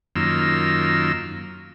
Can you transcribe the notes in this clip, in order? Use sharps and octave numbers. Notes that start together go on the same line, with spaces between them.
F#2 D#3 A#3 F4 E6